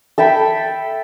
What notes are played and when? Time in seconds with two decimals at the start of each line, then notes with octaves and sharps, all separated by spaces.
0.18 A4 E5 G5 B5